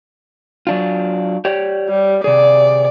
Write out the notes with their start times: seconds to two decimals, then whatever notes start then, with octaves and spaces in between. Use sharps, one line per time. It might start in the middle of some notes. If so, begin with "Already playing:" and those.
0.67 F#3 D4 F4
1.45 G4 C#5 D5
1.89 G3
2.24 C3 G#4 D5